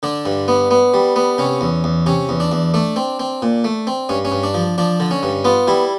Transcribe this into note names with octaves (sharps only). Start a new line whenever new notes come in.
D3 D4
G2
B3
B3
G3
B3
C3 C#4
E2
E2
C3 C#4
E2
D4
E2
A3 D4
C4
C4
A#2
A3
C4
G2 C#4
C#4
G2
D4
F3
F3 D4
D3
C#4
G2
B3 F4
G3 E4